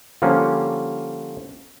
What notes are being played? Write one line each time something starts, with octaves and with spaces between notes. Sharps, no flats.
D3 F3 G3 A#3 C#4